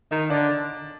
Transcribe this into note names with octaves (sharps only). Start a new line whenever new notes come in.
D#3 D#5
D3 D5